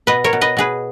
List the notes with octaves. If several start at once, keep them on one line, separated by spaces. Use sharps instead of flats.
B2 B4 D#5
A#4 C#5
B2
B4 D#5
B2 G#4 B4